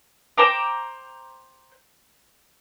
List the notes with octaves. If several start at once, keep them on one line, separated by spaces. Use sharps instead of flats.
C5 G5 A#5 D6